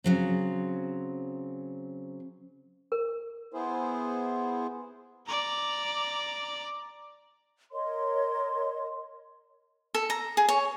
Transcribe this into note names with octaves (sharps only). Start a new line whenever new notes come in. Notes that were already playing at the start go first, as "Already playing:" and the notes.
C#3 F#3 C4
A#4
B3 E4 G#4 C5
D5 A#5
A#4 C#5 D#5 C6
A4
A#5
G#4
C#5